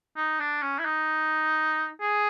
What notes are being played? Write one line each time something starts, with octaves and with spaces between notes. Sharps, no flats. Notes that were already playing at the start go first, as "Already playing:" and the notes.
D#4
D4
C#4
E4
D#4
G#4